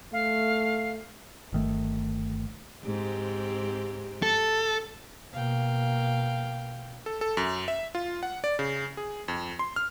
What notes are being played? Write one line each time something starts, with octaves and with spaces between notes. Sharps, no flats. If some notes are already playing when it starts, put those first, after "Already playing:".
A3 F5
G1 D#3 A3
G#2 C4 G4
A4
B2 A#3 F5 G5
A4
A4
F#2
E5
F4
F#5
D5
C#3
G#4
F2
C6
F6